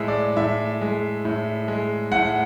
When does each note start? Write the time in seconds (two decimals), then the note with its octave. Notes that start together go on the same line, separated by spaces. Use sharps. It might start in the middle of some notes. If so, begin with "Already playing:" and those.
Already playing: A2 G#3 E5
0.08 D5
0.37 A2 E5
0.81 G#3
1.25 A2
1.68 G#3
2.11 A2 F#5